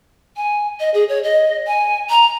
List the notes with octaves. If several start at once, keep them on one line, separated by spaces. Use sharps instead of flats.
G#5
D#5
G#4
C#5
D#5
G#5
A#5